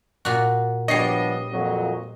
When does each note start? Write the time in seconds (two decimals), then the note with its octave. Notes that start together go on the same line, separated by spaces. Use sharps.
0.25 A#2 F#4
0.88 F3 G3 B3 D4 C#5 D#5 C7
1.52 F2 A#2 F#3